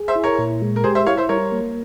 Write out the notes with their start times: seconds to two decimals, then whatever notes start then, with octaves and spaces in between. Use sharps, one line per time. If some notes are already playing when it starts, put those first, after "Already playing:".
Already playing: G#4
0.08 C5 E5
0.15 E4
0.23 A#4 C#5
0.39 A#2
0.62 G#3
0.76 A#4
0.84 G4 G#4 C5
0.95 C5 E5
1.06 E4 C#5 F5
1.17 C5 E5
1.29 G3 A#4 C#5
1.52 A#3